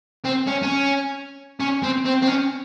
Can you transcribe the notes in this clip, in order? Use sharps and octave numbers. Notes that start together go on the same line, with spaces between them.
C4
C#4
C#4
C#4
C4
C4
C4
C#4